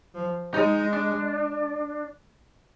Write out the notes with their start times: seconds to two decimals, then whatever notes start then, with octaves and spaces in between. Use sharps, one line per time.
0.14 F3
0.53 G#3 D#4
0.93 D4